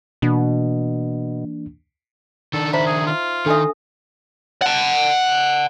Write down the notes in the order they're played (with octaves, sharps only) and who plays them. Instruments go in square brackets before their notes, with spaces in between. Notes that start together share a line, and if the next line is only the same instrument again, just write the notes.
[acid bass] B2 [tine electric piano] E3 A#3 D4
[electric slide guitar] D#3 D4 [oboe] A4
[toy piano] D#4 C5 A#5 [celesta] E5 [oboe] B5
[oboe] G#4
F4
[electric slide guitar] D#3 [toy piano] D4 E5 [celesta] A4 G#5 D#6
[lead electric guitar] F#5 A5